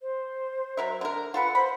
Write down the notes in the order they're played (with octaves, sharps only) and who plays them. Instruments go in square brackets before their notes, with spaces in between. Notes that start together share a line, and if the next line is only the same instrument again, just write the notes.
[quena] C5
[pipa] F#3 A#4 E5
D3 A#4
[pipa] F4 A4 B4 [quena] F#5
[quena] C5 [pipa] B5